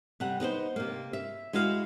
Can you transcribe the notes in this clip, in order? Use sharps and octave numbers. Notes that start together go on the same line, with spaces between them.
C3 G3 F#5
B3 D#4 B4 C5
C3 A#3
E5
G#3 E4 F#4 F5